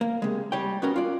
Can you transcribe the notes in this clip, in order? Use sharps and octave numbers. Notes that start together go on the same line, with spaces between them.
A#3
C3 G#3
G3 C#5 G5
B3 C#4 F#4 A#4
F4 D5